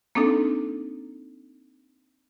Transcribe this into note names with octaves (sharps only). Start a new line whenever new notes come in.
A#3 C4 D4 D#4 A4